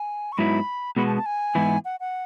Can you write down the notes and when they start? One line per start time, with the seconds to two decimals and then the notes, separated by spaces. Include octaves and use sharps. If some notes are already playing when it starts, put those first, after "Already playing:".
Already playing: G#5
0.32 C#6
0.38 G#2 F#3 B3 E4 B5
0.96 B2 G#3 B3 F#4 B5
1.06 A5
1.17 A5
1.26 G#5
1.55 G#2 E3 B3 E4
1.85 F#5
2.00 F#5